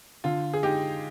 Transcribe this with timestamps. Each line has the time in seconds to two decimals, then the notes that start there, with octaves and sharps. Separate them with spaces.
0.24 D3 F4
0.53 G#4
0.63 G#3 D#4 G4